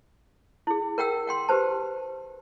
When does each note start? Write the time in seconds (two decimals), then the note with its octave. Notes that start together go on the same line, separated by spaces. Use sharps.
0.67 E4 G#4
0.98 A#4 F#5 G5 E6
1.27 F#5 G5 C6
1.49 G4 B4 C5 A5